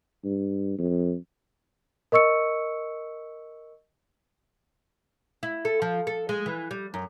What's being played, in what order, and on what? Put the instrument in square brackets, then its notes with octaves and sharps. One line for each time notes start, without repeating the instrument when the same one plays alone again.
[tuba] G2
F2
[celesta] A#4 D#5 C#6 E6 C#7
[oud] E4
A4
F3
A4
G#3
E3
G3
F#2